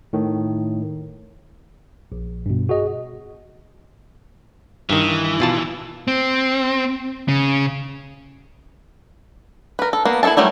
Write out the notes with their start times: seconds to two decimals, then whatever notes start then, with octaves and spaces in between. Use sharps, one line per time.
0.13 A2 D#3
2.12 A#1
2.46 G2 B2
2.69 F#4 G#4 D#5
4.90 G2 D#3 E3
5.40 B2 F4 A5
6.08 C4
7.28 C#3
9.79 A#4 B4
9.93 A4
10.05 A#3 B3
10.23 E4 G#4 A4 E5 A5
10.37 F#3 G3 A3 E4